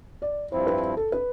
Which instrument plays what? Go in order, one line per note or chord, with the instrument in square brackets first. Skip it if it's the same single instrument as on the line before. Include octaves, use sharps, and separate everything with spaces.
[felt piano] D5
[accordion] G2 F3 C4 E4 [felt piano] C5
[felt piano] B4
A4
B4